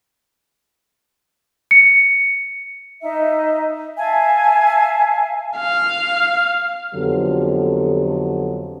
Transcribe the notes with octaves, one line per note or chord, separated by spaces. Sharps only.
C#7
D#4 E5
E5 F5 G#5 A5
F5
F2 D3 F#3 B3 G4 A4